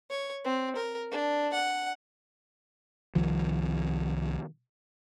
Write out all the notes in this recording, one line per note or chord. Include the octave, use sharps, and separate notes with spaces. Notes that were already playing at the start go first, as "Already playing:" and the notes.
C#5
C4
A#4
D4
F#5
C2 D#3 F3